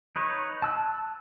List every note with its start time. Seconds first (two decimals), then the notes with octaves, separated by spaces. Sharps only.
0.16 D#4 B4 C#5
0.62 A5 E6 F#6